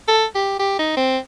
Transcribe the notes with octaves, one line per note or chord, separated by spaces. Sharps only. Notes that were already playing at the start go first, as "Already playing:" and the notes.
A4
G4
G4
D#4
C4